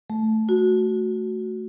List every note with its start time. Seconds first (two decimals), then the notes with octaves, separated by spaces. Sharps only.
0.10 A3
0.49 F#4